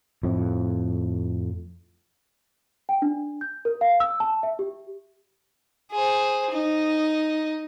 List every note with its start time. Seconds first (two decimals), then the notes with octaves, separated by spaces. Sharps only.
0.23 F2 A2
2.89 G5
3.02 D4
3.41 G6
3.65 A#4
3.81 F5
4.00 E6
4.20 A5
4.43 E5
4.59 G4
5.92 G#4 C5
6.51 D#4